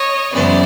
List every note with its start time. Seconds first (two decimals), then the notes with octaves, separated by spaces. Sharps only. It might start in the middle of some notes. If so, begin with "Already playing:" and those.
Already playing: C#5 D#5
0.33 F#2 C#3 E3 G#3 B3 C5 D5